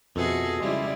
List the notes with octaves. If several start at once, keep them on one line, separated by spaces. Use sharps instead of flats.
F2 B2 F#4 G#4 A4 E5
C#3 G3 G#3 E4 F4